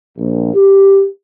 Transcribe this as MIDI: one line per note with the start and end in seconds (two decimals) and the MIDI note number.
0.18 0.53 34
0.55 1.06 67